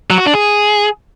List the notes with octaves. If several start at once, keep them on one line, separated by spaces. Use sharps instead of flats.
F#3
F#4
D4
G#4